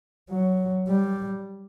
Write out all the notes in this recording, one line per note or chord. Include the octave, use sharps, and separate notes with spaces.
F#3
G3